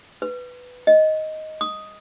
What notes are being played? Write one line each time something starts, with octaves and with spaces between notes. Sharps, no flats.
B4
D#5
D#6